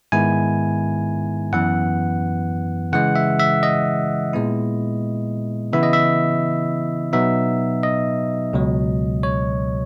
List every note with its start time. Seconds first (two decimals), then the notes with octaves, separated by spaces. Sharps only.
0.12 G#2 D#3 G#3 B3 E4 G#5
1.53 F#2 E3 B3 F#5
2.93 C#3 E3 G#3 F#5
3.16 E5
3.40 E5
3.63 D#5
4.33 A#2 G#3 B3 E4
5.73 C#3 E3 B3 E4 E5
5.83 D#5
5.93 E5
7.13 B2 F#3 B3 D#4 E5
7.83 D#5
8.53 C#2 B2 F#3
9.23 C#5